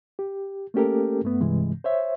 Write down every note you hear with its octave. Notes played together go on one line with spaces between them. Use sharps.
G4
A3 A#3 C#4 G4 A4 A#4
G2 A3 B3
G2 C3 E3 G#3
C5 C#5 E5